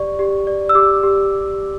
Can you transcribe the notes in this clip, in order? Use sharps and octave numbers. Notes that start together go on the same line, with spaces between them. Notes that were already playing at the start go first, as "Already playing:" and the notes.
Already playing: G4 D5 C#6
G4
D5
E6
G4 D6
G4